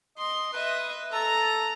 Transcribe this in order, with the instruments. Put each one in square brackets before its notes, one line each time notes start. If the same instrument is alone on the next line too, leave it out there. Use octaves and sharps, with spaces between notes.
[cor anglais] D#5 [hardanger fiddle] C6
[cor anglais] B4 [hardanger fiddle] D#5 E5
[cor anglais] A4 [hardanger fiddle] A#5